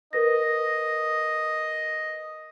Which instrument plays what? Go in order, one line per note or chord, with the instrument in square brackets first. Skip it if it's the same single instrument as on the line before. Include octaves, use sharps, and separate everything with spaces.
[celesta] A#4 B4 A#6 [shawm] D#5